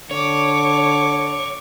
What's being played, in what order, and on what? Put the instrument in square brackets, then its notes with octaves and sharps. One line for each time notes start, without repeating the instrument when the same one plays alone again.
[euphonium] D3 [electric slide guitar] C#5 [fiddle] C#6 D6